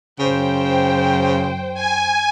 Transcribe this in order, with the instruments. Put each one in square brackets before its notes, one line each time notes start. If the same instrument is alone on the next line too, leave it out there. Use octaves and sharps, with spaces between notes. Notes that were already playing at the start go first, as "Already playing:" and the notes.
[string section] F#2 C5 G5 [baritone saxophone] C#3
[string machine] G#5